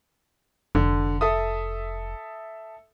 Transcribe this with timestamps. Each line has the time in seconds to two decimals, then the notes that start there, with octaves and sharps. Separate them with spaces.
0.75 F1 D3
1.21 A4 E5 D#6